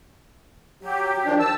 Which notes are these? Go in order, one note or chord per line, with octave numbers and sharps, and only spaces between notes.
F#3 G4
D#3 F3 D4
A5 E6